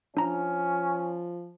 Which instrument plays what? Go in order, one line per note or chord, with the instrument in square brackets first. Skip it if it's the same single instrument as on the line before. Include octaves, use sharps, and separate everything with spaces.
[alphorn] F3 [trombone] C#4 [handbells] D4 A#5